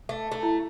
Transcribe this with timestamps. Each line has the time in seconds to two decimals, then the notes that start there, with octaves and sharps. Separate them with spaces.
0.09 A3
0.32 A3
0.43 E4